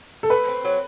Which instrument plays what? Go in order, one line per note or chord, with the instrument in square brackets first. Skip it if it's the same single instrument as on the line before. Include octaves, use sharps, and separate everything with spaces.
[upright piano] A4
[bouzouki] A3 [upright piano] B4
[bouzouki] C4
F#3